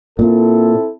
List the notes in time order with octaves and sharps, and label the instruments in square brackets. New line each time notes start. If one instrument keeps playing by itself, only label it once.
[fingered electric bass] A#2 [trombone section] C4 E4 A4